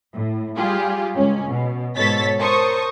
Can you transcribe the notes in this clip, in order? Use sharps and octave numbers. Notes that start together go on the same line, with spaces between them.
A2
G3 F4 G4 G#4
C#2 C#4
B2
G#2 B2 A4 C#5 A6 B6
A#4 C5 A5 C#6 D#6